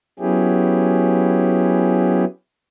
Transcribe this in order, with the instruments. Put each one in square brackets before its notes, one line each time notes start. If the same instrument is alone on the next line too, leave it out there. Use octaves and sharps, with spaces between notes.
[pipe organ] F#3 B3 C#4 E4 G4 G#4